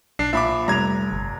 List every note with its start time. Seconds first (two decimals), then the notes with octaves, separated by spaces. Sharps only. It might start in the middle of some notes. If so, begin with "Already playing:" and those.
0.19 B1 D4 C7
0.33 A#1 E5 B5 D6
0.68 F1 G3 A#5 G#6 F7
1.12 G1